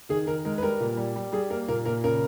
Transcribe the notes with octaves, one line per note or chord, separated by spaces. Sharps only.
D#3 G#4
D#3 A#4
G#3 A#4
B4
G3 A#4
A#2
G3
G3
G3 G#4
A#3 A#4
A#2 A#4
A#2 A#4
C#3 A#4